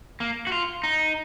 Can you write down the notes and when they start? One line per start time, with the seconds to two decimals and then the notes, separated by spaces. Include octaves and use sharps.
0.20 A#3
0.47 F#4
0.52 F4
0.83 D#4